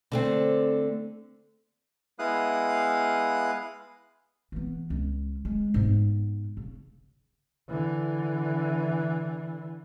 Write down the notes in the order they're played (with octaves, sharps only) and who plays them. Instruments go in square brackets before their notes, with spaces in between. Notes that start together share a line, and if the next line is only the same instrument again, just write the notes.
[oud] D3 A3 C4
[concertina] G#3 B3 E4 F5 D#6 F#6
[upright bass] E3 B3
C#2
G#3
G#2 B3
C#3
[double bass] D3 E3